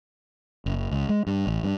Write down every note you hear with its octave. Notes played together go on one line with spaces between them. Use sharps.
F#1
C#2
G#3
G2
A1
G2